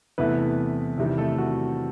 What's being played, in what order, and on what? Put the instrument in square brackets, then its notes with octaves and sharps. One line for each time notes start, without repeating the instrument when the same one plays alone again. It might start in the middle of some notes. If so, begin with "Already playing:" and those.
[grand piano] E2 C3 E3 A3 B3 B4
E2 C3 D#3 G3
A3 A4
F#4